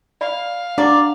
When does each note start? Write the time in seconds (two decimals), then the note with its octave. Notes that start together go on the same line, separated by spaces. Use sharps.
0.21 D5 F5 B5
0.78 D4 D5 F#5 A#5 D6